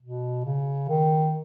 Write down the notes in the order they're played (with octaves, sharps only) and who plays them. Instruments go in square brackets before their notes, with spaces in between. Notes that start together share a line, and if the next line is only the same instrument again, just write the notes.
[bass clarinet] B2
C#3
D#3